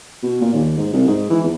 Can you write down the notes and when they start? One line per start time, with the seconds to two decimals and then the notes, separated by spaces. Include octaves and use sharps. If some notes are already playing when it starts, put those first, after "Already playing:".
0.23 B2
0.41 A#2
0.54 D#2
0.78 G#2
0.93 C2
1.08 G#2
1.30 E3
1.44 E2